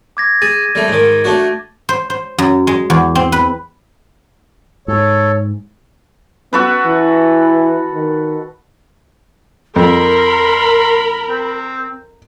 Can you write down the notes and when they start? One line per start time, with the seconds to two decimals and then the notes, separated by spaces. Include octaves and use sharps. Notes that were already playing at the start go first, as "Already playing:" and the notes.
0.17 D6 G#6 A#6
0.42 G#4 A6 D#7
0.75 G3 A3
0.88 G#2 D#3
1.24 A3 D4 F#4
1.89 C5
2.10 C5
2.38 F#2
2.67 G#3
2.90 E2
3.15 C4
3.32 B4
4.88 G#2 A4 C#5
6.53 B3 F#4 A4 B4
6.85 E3
7.94 D#3
9.76 F2 A#4 B5 C6
11.29 C4